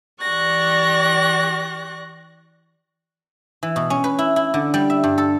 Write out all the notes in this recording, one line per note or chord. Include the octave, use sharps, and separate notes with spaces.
E3 G4 D5 C#6 F#6 A#6
E3
B2
C#4
B4
E4
E4
D3
G3
E5
G2
A4